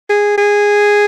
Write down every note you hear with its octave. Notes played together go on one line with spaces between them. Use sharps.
G#4
G#4